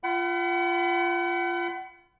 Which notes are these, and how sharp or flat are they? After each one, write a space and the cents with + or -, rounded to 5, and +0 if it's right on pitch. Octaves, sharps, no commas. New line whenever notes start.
F4 -15 F#5 +40 B5 +30